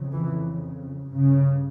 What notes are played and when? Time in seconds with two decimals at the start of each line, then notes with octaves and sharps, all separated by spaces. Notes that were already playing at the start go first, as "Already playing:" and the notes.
Already playing: F2 C#3
0.11 E3
1.12 G2 C#3